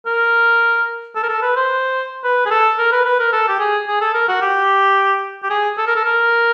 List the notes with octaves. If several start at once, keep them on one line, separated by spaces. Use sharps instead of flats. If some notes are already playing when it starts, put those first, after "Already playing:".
A#4
A4
A#4
A4
B4
C5
B4
G#4
A4
A#4
B4
B4
A#4
A4
G4
G#4
G#4
A4
A#4
F#4
G4
G4
G#4
A4
A#4
A4
A#4